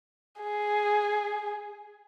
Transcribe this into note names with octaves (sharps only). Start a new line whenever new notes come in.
G#4